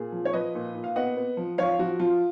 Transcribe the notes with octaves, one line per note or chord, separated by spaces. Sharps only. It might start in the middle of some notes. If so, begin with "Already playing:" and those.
Already playing: A#2 G#4
F3
C#5
F3 B4 D#5
A#2
A#2
F5
B3 D#5 F#5
B3
F3
F3 C#5 F5
F3 F#4
F3 F4